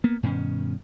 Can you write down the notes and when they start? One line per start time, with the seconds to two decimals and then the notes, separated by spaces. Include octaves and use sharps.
0.04 A#3 B3
0.23 G2 B2 D#3 C#4